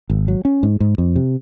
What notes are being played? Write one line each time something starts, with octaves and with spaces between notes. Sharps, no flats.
G#1
F#3
C#4
G#2
G#2
F2
C3